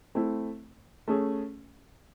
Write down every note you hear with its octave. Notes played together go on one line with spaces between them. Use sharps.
A3 C4 E4
A3 C#4 G#4